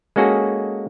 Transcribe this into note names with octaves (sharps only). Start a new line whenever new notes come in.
G#3 A#3 C#4 F#4 G#4 A4